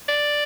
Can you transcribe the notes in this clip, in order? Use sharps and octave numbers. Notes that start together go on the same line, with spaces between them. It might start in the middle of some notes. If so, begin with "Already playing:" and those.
D5